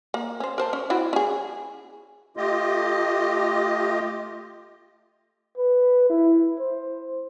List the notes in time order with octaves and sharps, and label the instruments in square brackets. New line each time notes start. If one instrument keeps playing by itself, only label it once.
[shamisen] A#3
C#4 C5
A#4 C5 A5
C#4
C4 E4 F#4
C#4 G#4
[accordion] A3 F4 G4 D#5
[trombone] B4
E4
C5